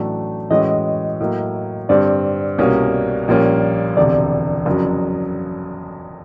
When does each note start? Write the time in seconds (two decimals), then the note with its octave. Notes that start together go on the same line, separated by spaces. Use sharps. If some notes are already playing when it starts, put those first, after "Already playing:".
Already playing: A1 A2 F#3 A3 D4
0.51 A2 E3 G#3 C#4 F#4 D#5
1.20 A2 F#3 A#3
1.89 G2 D3 G3 C4 D5
2.58 C2 B2 G3 A#3 C#4
3.28 A#1 A#2 G3 A#3 C#4
3.97 E1 D2 C3 D5
4.66 F#1 F2 C#3 F#3